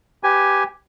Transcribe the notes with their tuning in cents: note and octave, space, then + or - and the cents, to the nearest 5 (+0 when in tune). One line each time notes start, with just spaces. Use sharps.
G4 +0 B4 +20 G#5 +0